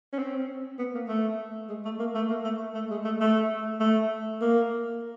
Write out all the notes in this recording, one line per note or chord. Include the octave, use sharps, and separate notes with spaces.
C#4
C4
B3
A#3
A3
G#3
A3
A#3
A3
A#3
A3
A3
G#3
A3
A3
A3
A#3